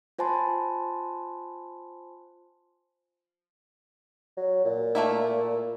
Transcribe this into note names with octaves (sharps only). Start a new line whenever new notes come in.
F4 C5 G#5 A5 B5 C6
F#3
A#2
A3 A#3 E4